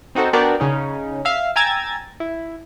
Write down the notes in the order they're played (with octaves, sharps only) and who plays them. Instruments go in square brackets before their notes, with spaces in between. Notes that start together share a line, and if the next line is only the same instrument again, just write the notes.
[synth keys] C4 D#4 F#4 A4 C5
B3 D4 F#4 A#4 D5 G5
C#3 C#4 D#4
E5 F5
G5 G#5 A#5 E6 G#6 A6
E4